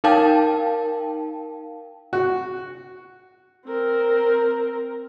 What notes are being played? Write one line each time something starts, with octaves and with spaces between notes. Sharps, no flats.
D#4 A#4 F5 G5 A5
F#4
C4 A#4